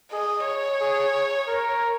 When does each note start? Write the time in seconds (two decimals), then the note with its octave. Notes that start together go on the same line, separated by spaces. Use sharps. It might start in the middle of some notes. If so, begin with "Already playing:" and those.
0.12 G#4 D#5
0.46 C#5
0.80 G#4
1.48 A#4